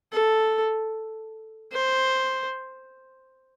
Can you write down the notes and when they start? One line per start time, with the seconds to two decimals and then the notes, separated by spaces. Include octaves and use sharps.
0.13 A4
1.73 C5